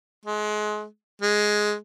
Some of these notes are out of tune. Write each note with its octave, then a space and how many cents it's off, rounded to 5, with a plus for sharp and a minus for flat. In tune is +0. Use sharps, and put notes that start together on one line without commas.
G#3 +30
G#3 +5